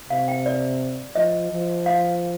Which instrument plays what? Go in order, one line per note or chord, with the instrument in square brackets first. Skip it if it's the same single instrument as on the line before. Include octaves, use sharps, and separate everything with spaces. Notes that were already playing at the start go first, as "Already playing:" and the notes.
[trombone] C3 [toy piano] F5
[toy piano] G5
D5
[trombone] F3 [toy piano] D#5
[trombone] F3
[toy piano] F5